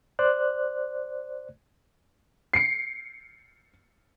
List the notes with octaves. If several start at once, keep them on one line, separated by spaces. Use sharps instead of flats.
C5 D5 F#6
C7 C#7